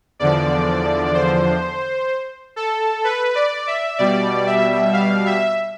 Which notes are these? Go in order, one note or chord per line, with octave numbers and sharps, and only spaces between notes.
E2 D3 F3 D5
C5
A4
B4
D5
E5
B2 G3 D5
E5
F5
E5